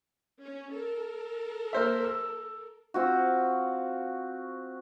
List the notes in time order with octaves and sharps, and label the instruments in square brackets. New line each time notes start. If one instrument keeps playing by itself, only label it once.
[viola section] C#4
A4 A#4
[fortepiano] A#3 C5 E5
E6
[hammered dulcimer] C4 F4 F#4